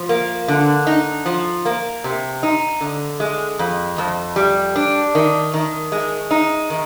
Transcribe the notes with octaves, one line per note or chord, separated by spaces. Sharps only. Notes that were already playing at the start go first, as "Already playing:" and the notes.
Already playing: F3
A#3
D3
D#4
F3
A#3
C3
D#4
D3
G#3
F2
F2
G3
D4
D#3
D#3
G#3
D#4
D#3